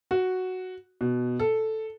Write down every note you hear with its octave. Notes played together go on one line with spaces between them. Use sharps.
F#4
B2
A4